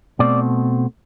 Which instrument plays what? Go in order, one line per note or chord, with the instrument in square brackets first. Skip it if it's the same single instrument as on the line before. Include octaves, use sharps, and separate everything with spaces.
[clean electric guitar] B2 A3 C4 D5